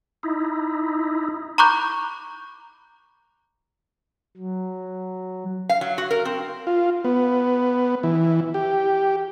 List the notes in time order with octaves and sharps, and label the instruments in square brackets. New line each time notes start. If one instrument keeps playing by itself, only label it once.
[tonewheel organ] D#4 E4
[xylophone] A#5 B5 C#6 D6 F#6 G6
[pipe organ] F#3
[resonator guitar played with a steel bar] F5
F#3
F#4
A#4
C4
[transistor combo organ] F4
B3
E3
G4